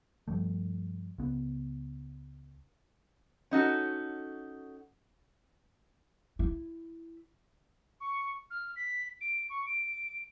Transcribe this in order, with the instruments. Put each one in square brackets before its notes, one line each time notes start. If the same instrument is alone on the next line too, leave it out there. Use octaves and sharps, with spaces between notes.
[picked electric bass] G2 F3 G3 A3
C#2 B3
[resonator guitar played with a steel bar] C#4 D#4 F#4 A4
[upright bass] E4
[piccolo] C#6
F6
B6
D7
C#6
D7